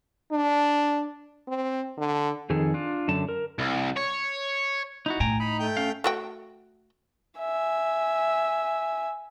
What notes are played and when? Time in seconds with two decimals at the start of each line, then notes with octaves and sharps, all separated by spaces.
0.32 D4
1.48 C4
1.98 D3
2.50 F2 D#3 G#4 A4
2.74 D4 F4
3.08 F#2 D3 A5
3.29 A#4
3.59 C2
3.96 C#5
5.06 D#4 E4 F#4
5.20 A2 G5 G#5 A#5
5.40 D#4 B5
5.60 A3 G5 G6
5.77 C#4 F5
6.04 A3 F#4 G5
7.39 E5 G#5